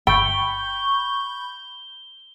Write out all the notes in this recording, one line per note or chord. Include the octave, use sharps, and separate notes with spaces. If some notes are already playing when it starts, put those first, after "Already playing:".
G1 G5 B5 C#6 E6 G6 A6 G7